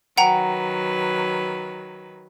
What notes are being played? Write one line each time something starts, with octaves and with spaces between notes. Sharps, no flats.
D#3 F#3 B4 F#5 G5 A#5